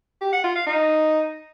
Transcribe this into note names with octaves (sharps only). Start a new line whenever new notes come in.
G4
F#5
F4
F5
D#4